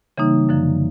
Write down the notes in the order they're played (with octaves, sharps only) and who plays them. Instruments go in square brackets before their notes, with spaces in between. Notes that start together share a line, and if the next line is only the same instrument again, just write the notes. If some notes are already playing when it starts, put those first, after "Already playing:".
[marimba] C#3 E3 G3 A#3 D#4
F#2 D3 F3